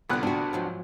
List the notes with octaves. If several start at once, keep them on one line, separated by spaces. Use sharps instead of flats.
C2 A#2 D3 B3 F#6
D4 F#4
G#2 F3 F#3